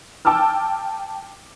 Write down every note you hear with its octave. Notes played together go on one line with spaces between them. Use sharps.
G5 A5 D6 E6 F6